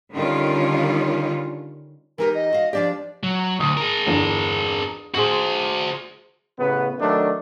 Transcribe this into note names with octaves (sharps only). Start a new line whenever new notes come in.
D3 D#3 G3 C#4 F4
E3 D#4 G4 A#4
D#5
F#4 F5
F3 D4 G4 D5
F#3
D2 D#6
G#4 A#4
G1 E2
F#4 G#4 C5 F#7
A1 C#3 B3 B4
D#3 F#3 A3 D4